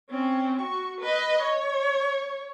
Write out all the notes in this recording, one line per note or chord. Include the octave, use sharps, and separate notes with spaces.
C4 C#4
F#4 C#6
B4 D#5
C#5